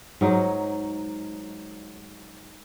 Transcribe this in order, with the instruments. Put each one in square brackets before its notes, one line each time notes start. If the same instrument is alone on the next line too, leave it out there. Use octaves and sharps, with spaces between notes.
[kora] G#2 F#3 D#4